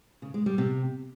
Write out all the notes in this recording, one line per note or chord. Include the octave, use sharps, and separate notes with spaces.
C#3
G#3
G3
C3